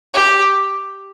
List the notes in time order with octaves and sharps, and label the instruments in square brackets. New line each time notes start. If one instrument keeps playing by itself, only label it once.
[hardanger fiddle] G4